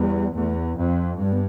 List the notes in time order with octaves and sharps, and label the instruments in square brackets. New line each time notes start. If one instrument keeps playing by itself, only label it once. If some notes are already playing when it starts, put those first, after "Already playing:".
Already playing: [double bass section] E2 [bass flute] G3
[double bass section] E2 [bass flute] A3
[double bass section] F2
[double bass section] G2 [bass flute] G3
[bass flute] B3